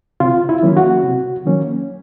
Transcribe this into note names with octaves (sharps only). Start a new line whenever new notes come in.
C3 F4
E4
D#3 F#3 A#3 C#4
F#4
C3
D#3 F#3 A#3 C#4